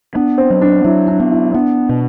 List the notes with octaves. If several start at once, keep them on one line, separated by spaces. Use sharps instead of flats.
B3 D4
C4
F#3
D4
F#3 E4
D4
B3
E4
B3 D4
B2